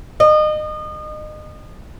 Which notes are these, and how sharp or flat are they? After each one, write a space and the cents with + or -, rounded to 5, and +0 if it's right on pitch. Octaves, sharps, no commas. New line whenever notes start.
D#5 -30